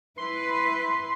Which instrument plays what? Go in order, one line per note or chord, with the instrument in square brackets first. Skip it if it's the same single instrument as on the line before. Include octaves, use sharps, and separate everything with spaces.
[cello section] E4 B4 [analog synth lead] C6